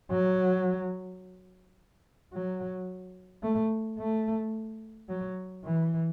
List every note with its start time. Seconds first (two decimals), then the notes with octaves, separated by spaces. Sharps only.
0.11 F#3
2.33 F#3
3.43 A3
3.99 A3
5.09 F#3
5.64 E3